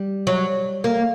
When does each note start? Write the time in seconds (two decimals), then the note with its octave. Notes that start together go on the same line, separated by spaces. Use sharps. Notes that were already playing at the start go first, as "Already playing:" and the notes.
Already playing: G3
0.27 F#3
0.84 A#3